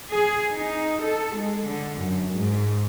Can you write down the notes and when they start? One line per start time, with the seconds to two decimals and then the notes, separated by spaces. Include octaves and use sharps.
0.11 G#4
0.55 D#4
1.06 A4
1.40 G#3
1.70 D3
2.02 F#2
2.34 G#2